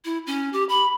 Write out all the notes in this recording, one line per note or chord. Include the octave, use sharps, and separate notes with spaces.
E4
C#4
G4
B5